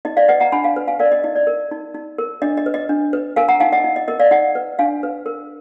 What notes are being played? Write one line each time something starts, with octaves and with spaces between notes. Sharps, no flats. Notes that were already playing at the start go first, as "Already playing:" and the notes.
D#4 D#5
D5 F5
B4 D#5 F#5
F#5 A#5
D4 G#5 B5
F5 G#5
B4
F5 G#5
A#4 D5 F5
D#5
D#4 D#5
D5
A#4
D#4
D#4
A#4
D4 D#5
D#5
B4
D#5
D4
B4
A#4 F5 G#5
F#5 A#5
D#4 F5 G#5
D#5 F#5
D#4
D#5
A#4 D#5
D5 F5
D#4 D#5 F#5
B4
D4 F5 G#5
B4
A#4